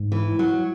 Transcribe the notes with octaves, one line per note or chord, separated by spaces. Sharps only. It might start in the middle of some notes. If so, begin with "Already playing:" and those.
Already playing: G#2
E3
F#3